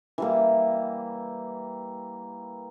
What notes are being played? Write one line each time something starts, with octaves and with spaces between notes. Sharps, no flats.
E3 G3 A#3